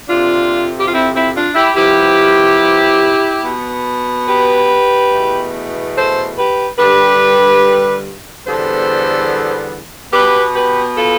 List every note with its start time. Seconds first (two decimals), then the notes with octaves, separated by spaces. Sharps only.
0.09 F2 C3 F3 D4 F4
0.79 G4
0.86 F4
0.93 C4 E4
1.14 C4 E4
1.34 D4 F4
1.55 E4 G4
1.76 C3 F3 B3 E4 G4
3.44 B2 B3
4.27 G4 B4
5.12 E2 B2 A3
5.95 A4 C5
6.36 G4 B4
6.78 G2 D3 G3 G4 B4
8.46 E2 D3 G3 B3 A4 C5
10.13 B2 B3 G4 B4
10.55 G4 B4
10.97 F4 A4